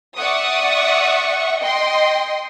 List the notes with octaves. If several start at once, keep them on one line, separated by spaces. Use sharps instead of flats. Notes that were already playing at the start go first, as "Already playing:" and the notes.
D5 E5 F#5 C#6 D#6
D#5 G5 C6